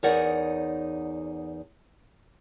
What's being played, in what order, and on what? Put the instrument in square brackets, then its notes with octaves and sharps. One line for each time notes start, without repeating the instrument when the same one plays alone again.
[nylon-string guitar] E2 D#4 A#4 C#5 D5 F#5